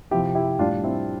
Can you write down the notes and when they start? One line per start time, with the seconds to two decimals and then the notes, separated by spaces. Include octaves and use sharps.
0.11 C3 F3 E4 G4
0.35 E4 G4
0.59 A2 G3 D4 F4
0.84 C4 E4